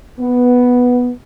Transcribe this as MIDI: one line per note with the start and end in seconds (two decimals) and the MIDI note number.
0.19 1.09 59